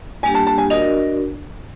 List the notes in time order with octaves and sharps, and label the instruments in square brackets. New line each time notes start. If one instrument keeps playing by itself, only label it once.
[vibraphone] G3 A#3 D4 G4 [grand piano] G#5
[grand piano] A5
A5
G#5
[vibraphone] D4 F#4 A#4 D5 [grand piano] D#5